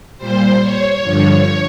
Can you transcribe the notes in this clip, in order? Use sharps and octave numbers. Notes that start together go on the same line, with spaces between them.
A#2 G3 C5
C#5
G2 D3 F3